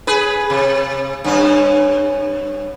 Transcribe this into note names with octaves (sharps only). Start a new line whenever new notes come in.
G#4 B4
C3
G2 C#4